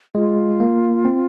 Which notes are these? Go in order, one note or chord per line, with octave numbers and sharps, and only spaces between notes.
G#3 F4
A#3
C4